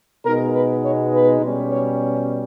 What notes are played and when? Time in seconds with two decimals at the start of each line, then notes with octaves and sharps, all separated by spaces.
0.25 B2 G#3 B3 D#4 A#4
0.54 B4
0.83 C#5
1.13 B4
1.41 B2 G3 C#4
1.71 C#5